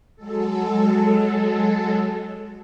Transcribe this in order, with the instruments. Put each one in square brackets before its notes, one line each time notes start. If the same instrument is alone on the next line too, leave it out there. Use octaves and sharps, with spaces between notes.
[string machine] F#3 G#3 A4